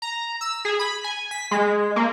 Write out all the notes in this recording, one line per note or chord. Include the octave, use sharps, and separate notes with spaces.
A#5
E6
G#4
B5
G#5
B6
G#3
A#3